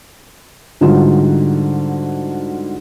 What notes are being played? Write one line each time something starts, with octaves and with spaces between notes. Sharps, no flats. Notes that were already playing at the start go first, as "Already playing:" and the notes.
G#2 D3 G3 D#4 F4 F#4